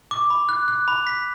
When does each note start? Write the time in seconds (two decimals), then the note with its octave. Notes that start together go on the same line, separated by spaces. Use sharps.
0.11 D6
0.30 B5
0.49 F#6
0.68 F#6
0.88 B5
1.07 B6